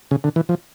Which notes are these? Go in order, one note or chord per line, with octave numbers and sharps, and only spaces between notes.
C#3
D3
E3
F3